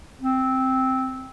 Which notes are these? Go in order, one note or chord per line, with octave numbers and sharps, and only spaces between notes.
C4